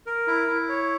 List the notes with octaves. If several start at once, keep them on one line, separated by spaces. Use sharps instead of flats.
A#4
E4
E4
C#5